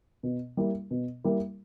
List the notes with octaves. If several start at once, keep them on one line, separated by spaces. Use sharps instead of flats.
B2
G3 A#3 E4
B2
G3 A#3 E4